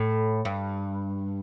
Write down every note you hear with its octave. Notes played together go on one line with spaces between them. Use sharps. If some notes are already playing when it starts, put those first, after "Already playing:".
Already playing: A2
G2